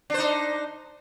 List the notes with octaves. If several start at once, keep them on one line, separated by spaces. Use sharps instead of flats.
D4 D#4 C5